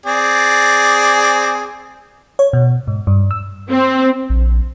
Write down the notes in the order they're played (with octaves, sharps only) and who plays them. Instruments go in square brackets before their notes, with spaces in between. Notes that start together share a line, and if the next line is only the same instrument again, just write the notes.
[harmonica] C4 G#4 D5
[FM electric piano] C#5
B2
G#2
G2
E6
[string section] C4
[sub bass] A#1